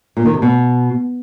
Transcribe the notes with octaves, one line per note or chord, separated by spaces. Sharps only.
A#2
D#3
C3
B2